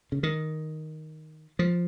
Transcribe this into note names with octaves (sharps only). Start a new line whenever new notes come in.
C#3
D#3
F3